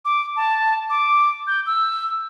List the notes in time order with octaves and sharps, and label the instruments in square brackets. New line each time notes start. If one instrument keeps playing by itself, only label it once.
[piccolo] D6
A5
D6
G6
E6